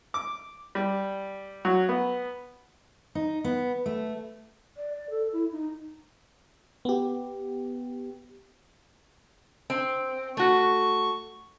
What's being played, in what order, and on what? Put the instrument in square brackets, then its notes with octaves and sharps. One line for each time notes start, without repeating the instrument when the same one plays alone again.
[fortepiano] D6
G3
F#3
B3
[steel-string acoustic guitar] D#4
B3
A3
[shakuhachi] D5
D5
A4
E4
D#4
[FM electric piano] B3 G4
[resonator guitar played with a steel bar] C4
[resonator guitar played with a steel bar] A3 F#4 [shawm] C#6